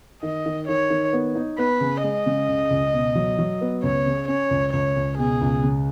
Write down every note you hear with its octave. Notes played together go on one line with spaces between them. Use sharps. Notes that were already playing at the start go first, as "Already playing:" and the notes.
D#3 D#5
D#3
D#3 C#5
D#3
B3
D#4
B3 B4
C#3
G#3 D#5
C#3
C#2
C#2
B2
F#3
F#3
B3
C#2 C#5
C#3
C#4 C#5
C#2
C#2 C#5
C#2
B2 G#4
C#2
C#3